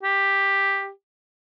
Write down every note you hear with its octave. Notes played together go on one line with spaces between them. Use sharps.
G4